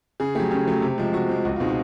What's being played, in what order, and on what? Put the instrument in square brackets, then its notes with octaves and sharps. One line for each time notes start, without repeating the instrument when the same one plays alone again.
[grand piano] C#3 G#4
F#3 A3 G4
C#3 G4
F#3 A3
C3
F3 G#3
C3 F#4
F3 G#3
C#2 F#4
B2 G#3 C4 D#4 F4
F#4